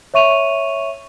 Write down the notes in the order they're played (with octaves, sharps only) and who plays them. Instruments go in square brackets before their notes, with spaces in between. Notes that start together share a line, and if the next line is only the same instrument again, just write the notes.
[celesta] C#5 E5 C#6 D#7 F7